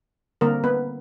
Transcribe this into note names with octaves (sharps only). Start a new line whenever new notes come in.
D3 G3 A#3 C4 A#4
B3 B4